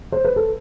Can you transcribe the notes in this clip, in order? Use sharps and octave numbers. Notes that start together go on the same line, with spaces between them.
C5
B4
A4